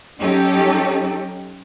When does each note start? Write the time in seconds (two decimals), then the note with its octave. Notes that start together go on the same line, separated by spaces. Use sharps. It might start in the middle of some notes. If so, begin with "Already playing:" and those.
0.20 F#3 C#4 D#4 G4 A4